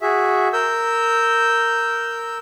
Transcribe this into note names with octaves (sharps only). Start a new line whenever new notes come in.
F#4 G#4 E5
A#4 E6 G6